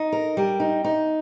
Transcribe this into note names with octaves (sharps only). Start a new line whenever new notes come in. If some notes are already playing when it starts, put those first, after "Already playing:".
Already playing: D#4
A#4
G3
D#4
D#4